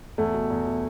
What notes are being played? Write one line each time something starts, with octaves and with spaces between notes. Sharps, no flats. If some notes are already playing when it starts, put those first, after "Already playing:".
E2 A3
B2
E2
B2